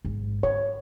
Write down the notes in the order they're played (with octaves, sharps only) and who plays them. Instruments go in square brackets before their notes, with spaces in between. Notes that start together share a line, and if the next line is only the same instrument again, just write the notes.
[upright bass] A1 G#2
[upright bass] D3 [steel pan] C#5